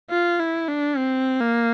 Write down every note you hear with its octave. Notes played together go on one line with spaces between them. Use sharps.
F4
E4
D4
C4
A#3